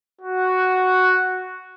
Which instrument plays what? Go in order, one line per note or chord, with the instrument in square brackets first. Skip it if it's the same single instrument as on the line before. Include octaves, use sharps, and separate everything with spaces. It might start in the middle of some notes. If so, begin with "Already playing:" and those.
[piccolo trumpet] F#4